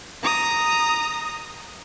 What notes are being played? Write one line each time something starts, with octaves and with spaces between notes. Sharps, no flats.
A#5 D#6